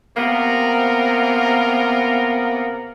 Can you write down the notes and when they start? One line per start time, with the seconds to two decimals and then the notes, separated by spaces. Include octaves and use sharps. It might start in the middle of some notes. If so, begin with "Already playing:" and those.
0.16 C3 A#3 B3 A#4